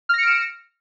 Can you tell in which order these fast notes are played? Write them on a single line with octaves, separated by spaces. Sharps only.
F6 A#6 C#7 D7 E7